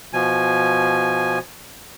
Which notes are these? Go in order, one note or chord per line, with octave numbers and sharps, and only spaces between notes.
B2 F3 G#5